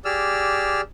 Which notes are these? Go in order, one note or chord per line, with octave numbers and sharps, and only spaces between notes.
G4 G#4 D5 E6 F6